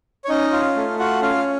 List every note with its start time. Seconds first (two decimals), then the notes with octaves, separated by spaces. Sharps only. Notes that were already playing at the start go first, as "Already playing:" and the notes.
0.25 C#5
0.28 C#4 D#4 D#5
0.52 F4
0.76 A3
0.99 F4 F#4 F#5
1.22 C#4 F4 F5